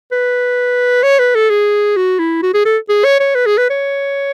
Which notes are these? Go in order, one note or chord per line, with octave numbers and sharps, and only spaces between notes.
B4
C#5
B4
A4
G#4
F#4
E4
F#4
G#4
A4
G#4
C#5
C#5
B4
G#4
B4
C#5